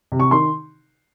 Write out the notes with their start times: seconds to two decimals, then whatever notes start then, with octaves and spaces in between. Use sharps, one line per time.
0.12 C3
0.20 C#6
0.31 D#3 C6